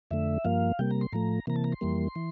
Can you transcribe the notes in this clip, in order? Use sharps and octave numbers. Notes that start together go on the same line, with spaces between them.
F2 D3 A3 E5
G2 F3 A#3 F5
C3 G3 A#3 G5
A#5
C6
A2 F3 A3 A#5
C3 E3 A#3 A#5
A5
A#5
C6
F2 E3 G3 A#3
E3